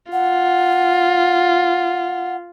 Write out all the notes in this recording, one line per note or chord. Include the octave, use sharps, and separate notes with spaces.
F4 F#5